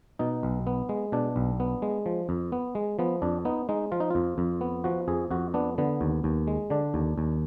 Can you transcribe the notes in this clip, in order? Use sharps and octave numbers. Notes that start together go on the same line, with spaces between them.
B2 D#4
B1
B3
G#3
B2 D4
B1
B3
G#3
F3
F2
B3
G#3
F3 B3
F2 D4
B3 D#4
G#3 D#4
F3 F4
D#4
F2 F4
F2
B3
F3 F#4
F2 G#4
F2 F#4
B3 D4
D3 B3
D#2
D#2
G#3
D3 D4
D#2
D#2